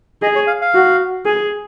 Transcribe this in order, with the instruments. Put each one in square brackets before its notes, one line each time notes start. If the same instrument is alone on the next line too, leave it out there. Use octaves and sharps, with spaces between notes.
[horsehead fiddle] G#4 [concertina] D#5
[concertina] C#5
F5
F5
[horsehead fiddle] F#4
G#4